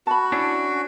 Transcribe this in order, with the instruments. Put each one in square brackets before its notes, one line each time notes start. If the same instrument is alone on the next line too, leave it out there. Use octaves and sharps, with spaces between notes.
[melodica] F#4 [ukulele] A5 B5
[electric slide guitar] C#4 D4 [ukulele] E4